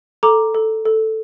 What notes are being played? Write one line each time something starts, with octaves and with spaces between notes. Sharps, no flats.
A4 A#5 D6
A4
A4